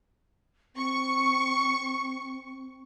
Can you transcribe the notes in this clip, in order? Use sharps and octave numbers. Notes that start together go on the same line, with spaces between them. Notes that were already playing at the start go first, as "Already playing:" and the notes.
C4 C#6